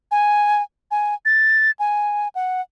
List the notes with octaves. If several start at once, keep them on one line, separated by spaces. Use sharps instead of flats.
G#5
G#5
A6
G#5
F#5